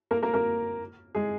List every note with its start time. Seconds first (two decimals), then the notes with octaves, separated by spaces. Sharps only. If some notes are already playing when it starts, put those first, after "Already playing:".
0.11 A#3 A#4
0.23 A#3 A#4
0.34 A#3 A#4
1.15 G#3 G#4